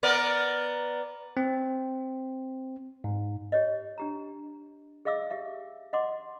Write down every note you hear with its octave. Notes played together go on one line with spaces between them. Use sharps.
B3 A#4 D5
C4
G#2
G4 C#5 D#5
D4 G4 A#5
G#4 D#5 F5 D6 E6
G4 E5 F5
D#5 F#5 C6 D6